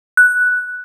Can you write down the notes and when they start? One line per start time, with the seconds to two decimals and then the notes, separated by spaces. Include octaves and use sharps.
0.17 F#6